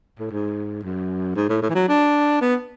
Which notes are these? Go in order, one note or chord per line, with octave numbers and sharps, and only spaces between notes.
A2
G#2
F#2
G#2
A2
A2
E3
F#3
D4
B3